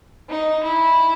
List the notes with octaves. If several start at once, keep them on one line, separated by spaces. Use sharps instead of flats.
D#4
E4